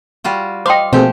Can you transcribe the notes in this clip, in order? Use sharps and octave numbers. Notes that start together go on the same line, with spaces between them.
G3 F4 F#4
C5 D#5 F5 G5 C6 D6
B2 F3 A3 A#3 C4 G4 G#4